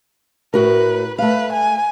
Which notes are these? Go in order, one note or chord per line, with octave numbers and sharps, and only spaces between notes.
A2 F#4 A#4 B4
A3 B4 F5
G#5